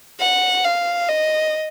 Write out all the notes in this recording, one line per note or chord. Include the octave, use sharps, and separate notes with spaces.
F#5
F5
D#5